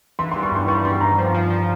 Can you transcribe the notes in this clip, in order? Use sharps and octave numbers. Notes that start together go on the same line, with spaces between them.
E3 C6
G3 C6
C#6
G2 C6
G3 C#6
G3 C6
G2 A#5
F3
F3
F3